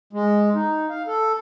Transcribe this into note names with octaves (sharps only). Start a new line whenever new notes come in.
G#3
D#4
F5
A4